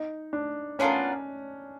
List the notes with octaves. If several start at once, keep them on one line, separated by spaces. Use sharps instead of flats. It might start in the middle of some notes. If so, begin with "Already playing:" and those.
Already playing: D#4
D4
B3 C#4 D4 F4 A#4